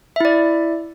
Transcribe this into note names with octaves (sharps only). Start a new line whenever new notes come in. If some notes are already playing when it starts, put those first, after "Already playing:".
E4 D5 E5